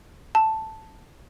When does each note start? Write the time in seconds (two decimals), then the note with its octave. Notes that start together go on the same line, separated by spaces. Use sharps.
0.35 A5